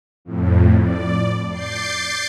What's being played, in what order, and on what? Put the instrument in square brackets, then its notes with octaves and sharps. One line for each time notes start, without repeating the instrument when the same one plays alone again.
[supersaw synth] F2 A2
D5
D6 G6 A6 C7